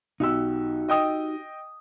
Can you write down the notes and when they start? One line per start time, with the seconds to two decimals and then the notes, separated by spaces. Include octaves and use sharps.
0.20 B1 D#4 F#4 G4 E6
0.89 D#5 G5 D#6